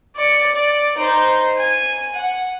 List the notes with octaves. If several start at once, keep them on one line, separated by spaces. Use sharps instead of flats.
D5 C#7
D5
D#4 C5
G#5
F#5